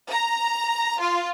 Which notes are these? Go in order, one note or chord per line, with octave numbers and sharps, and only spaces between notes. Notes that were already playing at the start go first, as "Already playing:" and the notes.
A#5
F4